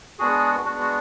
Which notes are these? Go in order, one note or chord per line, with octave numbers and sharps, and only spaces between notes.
G#3 B3 D4 F#4 G#4
G#3 B3 D4 F#4
F#4